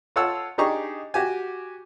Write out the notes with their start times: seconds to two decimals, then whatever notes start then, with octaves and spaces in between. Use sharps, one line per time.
0.16 F4 A4 C#5 F#5 A5 E6
0.58 D4 D#4 G4 G#4 A#5 C#6
1.14 F#4 G4 G5 G#5